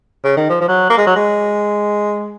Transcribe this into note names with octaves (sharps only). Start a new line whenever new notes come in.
C#3
D#3
F3
F3
F#3
A#3
G#3
F#3
G#3